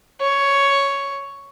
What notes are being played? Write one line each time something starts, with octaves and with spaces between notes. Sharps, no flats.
C#5